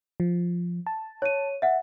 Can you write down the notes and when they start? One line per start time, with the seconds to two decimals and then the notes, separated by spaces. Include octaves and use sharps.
0.20 F3
0.87 A5
1.22 C#5 D#7
1.62 E5 F#5